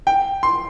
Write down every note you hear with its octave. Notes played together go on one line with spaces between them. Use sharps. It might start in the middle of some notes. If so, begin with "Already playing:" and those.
G5
C6